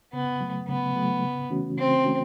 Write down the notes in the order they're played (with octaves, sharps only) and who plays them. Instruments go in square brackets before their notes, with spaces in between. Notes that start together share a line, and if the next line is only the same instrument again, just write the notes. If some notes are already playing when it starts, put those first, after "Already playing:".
[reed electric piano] C#3 [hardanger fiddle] B3
[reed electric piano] F#3 A3
[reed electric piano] C#3 [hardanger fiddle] B3
[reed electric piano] F#3 A3
C#3
E3 A3 C#4 F#4
[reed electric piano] C#3 [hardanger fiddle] C4
[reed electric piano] E3 A3 C#4 F#4